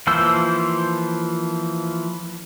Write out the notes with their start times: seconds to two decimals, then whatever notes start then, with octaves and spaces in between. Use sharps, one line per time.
0.07 E3 F3 A#3 C5 E6